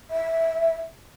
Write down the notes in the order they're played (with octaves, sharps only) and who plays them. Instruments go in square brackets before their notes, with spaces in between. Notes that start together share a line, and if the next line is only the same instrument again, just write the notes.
[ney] E5